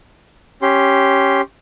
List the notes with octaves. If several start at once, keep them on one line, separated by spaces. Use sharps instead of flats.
C#4 G4 C6